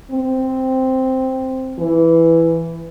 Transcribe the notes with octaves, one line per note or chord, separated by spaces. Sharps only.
C4
E3